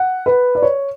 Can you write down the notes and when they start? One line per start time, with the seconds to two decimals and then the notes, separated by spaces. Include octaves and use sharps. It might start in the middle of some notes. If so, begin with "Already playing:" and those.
Already playing: F#5
0.26 B4
0.55 D5
0.62 C#5